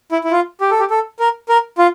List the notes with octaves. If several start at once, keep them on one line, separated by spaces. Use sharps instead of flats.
E4
E4
F4
G4
A4
G4
A4
A#4
A#4
F4